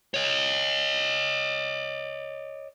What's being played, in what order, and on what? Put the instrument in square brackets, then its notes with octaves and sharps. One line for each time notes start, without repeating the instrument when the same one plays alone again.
[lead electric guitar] C#5 D#5